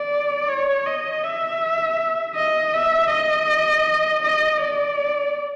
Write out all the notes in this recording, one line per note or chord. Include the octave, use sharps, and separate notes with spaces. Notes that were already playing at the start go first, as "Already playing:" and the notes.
Already playing: D5
C#5
D#5
E5
D#5
E5
D#5
D#5
D5